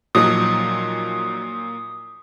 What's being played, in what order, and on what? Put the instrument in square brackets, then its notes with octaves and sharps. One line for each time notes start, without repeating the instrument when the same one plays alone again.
[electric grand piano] A#2 [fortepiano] F3 F#3 D#4 [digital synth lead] D#6